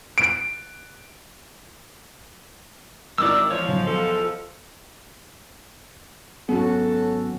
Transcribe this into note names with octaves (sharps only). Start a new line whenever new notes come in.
D7
G#1 D#3 E4 D5 D6 E6
E2 F3 C#5
B1
A4
G#1 F#3 B3 C#4 F#4 A4